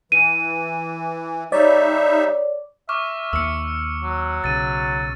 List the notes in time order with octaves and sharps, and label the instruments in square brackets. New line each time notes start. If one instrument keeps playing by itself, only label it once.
[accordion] E3 [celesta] D#7
[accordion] G3 D#4 E5 [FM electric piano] C#5 D5
[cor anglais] E5 [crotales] C#6 D6 F6
[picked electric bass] D#2 [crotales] E6 C#7
[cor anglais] F#3
[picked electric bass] B1 C#3 [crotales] A6 D#7